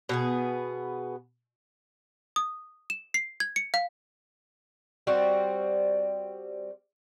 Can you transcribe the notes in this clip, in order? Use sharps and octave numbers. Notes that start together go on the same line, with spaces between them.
B2 B3 G#4
D#6
E7
C7
G#6
C#7
F5
G3 C4 F#4